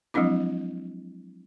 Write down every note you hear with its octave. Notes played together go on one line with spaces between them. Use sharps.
F3 F#3 G#3 C4 D4 E4